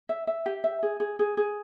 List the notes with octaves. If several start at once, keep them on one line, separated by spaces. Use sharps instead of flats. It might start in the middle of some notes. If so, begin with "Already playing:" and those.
E5
E5
G4
E5
G#4
G#4
G#4
G#4